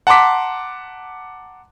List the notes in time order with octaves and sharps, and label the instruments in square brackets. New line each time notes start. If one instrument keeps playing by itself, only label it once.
[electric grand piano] F#5 A5 A#5 C6 D6 B6